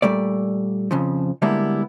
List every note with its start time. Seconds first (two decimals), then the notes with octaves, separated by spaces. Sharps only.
0.02 A#2 G3 A3 D5
0.91 F2 C#3 F3
1.42 D3 G3 G#3 A#3 B3 E4